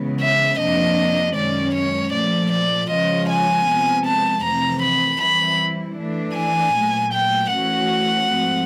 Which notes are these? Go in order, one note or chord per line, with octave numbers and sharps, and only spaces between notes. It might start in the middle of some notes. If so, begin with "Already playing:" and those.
Already playing: C#3 E3 G#3 B3
E5
F2 C3 F3 A#3 D4 D#5
F#2 D#3 G#3 C#4 D5
C#5
A#2 F3 A3 D5
D5
C#3 F3 G#3 C#4 F4 D#5
G#5
C3 F3 G#3 B3
A5
F2 C3 E3 A3 C4 A#5
B5
E3 G3 C4 E4 B5
E3 A3 D4
G#5
A#2 F#3 A3
G5
E3 A3 C#4 F#4 F#5
G#2 F3 A3 C4